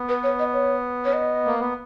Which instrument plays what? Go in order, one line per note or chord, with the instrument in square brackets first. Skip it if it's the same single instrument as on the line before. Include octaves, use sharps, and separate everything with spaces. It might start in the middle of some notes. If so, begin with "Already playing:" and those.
Already playing: [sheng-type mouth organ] B3
[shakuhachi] B4
C#5
D#5
C#5
C#5
D#5
[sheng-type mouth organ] A#3
B3